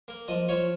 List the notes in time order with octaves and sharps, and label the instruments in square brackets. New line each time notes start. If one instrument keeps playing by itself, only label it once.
[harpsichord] A#3
F3 D#5 D#6
F3 C#5 C#6